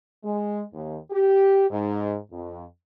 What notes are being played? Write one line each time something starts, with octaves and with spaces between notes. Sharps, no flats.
G#3
D#2
G4
G#2
F2